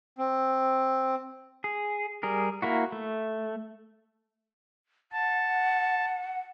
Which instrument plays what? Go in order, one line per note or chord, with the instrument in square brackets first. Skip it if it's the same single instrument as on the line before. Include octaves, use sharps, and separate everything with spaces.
[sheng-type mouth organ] C4
[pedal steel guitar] G#4
G3 G#4 A#4
A#3 E4 F#4
A3
[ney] F#5 [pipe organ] A5